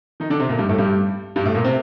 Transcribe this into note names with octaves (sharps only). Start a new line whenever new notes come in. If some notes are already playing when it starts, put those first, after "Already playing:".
D#3 D#4
D3 D4
C3 C4
A#2 A#3
G2 G3
A2 A3
G2 G3
G2 G3
A2 A3
A#2 A#3
C3 C4